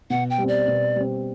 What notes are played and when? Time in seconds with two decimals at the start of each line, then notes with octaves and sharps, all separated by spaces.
0.10 B2 F#5
0.30 G5
0.38 G3
0.43 C4 D5
0.68 B2
0.96 G3 C4